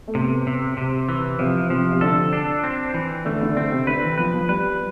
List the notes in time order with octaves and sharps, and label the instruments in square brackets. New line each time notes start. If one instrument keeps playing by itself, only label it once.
[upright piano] A3
[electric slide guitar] C3 [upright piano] B3
[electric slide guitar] C3
C3
E3
[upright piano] C3 [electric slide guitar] F3
[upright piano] C3 [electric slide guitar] F3
[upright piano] C3
[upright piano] D3 [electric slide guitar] A4
[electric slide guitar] D4
C4
E3
[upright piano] D3 [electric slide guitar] A3
[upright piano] D3
[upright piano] D3 [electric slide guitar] C4
[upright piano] C3
[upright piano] D3 [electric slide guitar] B4
[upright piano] E3
[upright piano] F3 [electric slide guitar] B4
[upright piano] F3
[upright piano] G3 [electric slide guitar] B4